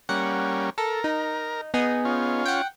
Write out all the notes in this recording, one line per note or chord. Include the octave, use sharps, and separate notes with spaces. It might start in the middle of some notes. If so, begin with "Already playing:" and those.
G3 A#3 C#4 F#5
A4 A#4
D#4
B3 D#4 G#4
C#4 F4
F#5 G5